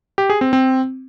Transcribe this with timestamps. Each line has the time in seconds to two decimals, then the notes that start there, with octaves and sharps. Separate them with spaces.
0.18 G4
0.30 G#4
0.41 C4
0.53 C4